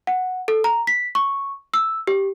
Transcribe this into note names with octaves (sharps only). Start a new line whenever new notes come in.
F#5
A4
A#5
B6
C#6
E6
G4